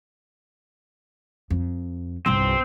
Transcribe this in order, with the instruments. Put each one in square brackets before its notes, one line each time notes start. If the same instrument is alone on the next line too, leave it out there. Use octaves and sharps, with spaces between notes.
[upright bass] F2
[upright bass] G1 C2 [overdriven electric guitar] C4